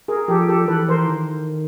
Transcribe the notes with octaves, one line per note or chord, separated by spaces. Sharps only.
G#4 A#4
F3 G4 A4
G4 A4
E3 A4 B4
A#4 C5
D#3